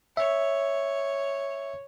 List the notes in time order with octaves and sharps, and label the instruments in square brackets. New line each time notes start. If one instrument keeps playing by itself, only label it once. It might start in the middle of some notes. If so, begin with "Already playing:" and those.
[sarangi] C#5 [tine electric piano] E5